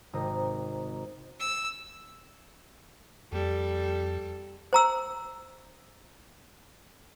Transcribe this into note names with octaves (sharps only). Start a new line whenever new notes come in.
G#1 C3 A#5 D#6
E6
F2 G3 A4
C5 A#5 E6